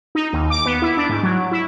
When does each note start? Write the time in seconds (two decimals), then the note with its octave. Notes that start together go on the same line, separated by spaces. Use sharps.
0.15 D#4
0.33 D#2
0.50 D6
0.66 B3
0.82 E4
0.97 D4
1.09 G#2
1.23 F#3
1.52 E4